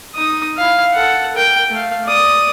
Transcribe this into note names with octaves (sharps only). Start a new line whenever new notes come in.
D#4 D#6
E4 F5
A4 F#5
A#4 G5
A3 F5
D5 D#6